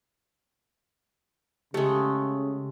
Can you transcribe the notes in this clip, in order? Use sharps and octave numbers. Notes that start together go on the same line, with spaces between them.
C#3 G#3 A3 G4